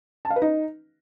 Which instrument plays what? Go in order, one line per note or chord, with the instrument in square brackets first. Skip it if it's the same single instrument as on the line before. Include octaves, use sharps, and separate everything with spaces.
[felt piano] A5
F5
B4
D#4